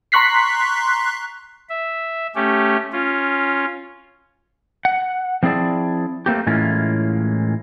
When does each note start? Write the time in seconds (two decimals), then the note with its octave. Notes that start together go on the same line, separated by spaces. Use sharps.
0.12 A#5 C6 C#6 F#6 B6 C7
1.69 E5
2.35 A3 C#4 G4
2.92 C#4 F4
4.85 F#5
5.43 F3 C4 E4 G#4 D5 A5
6.26 A3 A#3 C4 G4
6.47 A2 E3 G#3 A#3 C#4 F4